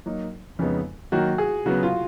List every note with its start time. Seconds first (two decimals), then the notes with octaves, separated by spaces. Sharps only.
0.06 F#3 A#3 D#4
0.59 F2 C#3 G#3 B3 D#4
1.12 D#3 F#3 A#3 F#4
1.38 G#4
1.66 C#3 F#3 B3 F#4
1.83 F4